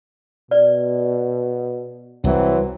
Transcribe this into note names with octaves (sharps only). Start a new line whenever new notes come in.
B2 D5
C2 E3 F#3 C4